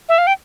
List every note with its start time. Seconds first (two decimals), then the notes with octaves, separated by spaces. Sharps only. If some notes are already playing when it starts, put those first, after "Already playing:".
0.09 E5
0.18 F5
0.27 G5